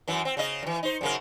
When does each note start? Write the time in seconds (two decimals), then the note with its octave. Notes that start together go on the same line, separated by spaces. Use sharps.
0.08 F#2 E3
0.25 C4
0.37 C#3 D#5
0.63 F#2 E3
0.83 D#4 C5
1.01 F#2 C#3 A#4